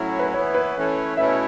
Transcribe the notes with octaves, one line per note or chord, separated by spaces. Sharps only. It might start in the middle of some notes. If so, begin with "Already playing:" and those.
Already playing: A2 F#3 C#4 E4
B4
E3 B3 E4 C#5
B4
E3 A3 C#4
B2 A3 C#4 E4 E5